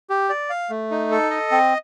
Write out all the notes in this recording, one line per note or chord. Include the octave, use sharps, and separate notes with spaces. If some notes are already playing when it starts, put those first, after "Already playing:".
G4
D5
F5
A3
D#4
A4
D#5
C4